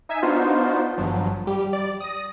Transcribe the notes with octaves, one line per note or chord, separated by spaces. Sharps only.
D#4 E5 G#5 B6
B3 D4 D#4 F4 F#4 C5
G#1 G2 F3 F#3
G3 G4
D5
D#6 A#6